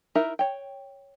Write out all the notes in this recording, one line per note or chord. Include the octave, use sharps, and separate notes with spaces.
D#4 E4 A#4 E5
C#5 G5